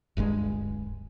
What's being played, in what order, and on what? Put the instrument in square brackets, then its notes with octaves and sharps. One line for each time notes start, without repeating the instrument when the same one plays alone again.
[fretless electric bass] D1 G1 G2 G#3